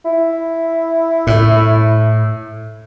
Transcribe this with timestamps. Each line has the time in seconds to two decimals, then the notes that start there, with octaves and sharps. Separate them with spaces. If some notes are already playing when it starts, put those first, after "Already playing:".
0.05 E4
1.27 A2